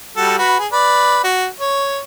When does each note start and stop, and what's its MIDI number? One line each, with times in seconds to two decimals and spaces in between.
0.17 0.37 55
0.17 0.37 66
0.17 0.37 69
0.39 0.57 66
0.39 0.57 71
0.59 0.67 68
0.72 1.23 71
0.72 1.23 74
1.24 1.47 66
1.60 2.00 73